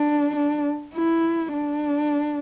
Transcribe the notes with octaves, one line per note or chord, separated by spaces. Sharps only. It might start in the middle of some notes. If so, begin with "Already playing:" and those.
Already playing: D4
D4
E4
D4